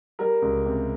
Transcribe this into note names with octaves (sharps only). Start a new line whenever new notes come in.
G3 A#4
C#2
C3